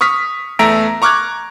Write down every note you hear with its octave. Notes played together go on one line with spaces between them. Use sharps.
C#6 D#6 F6 B6
E2 A3 E5 A#5 A#6 D7
A#5 C#6 D6 F6 F#6 G#6